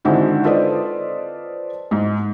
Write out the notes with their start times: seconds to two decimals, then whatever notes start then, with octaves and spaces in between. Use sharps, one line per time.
0.05 D3 D#3 G#3 C4 E4 F#4
0.44 F4 A4 B4 C5 D5 D#5
1.91 G#2